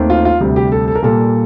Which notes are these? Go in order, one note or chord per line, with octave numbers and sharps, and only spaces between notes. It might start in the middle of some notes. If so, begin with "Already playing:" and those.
Already playing: D#2 D#3 A3 C4
F4
F4
D2 C3 G3
G4
A4
A4
A#4
A#2 G3 A#3 A4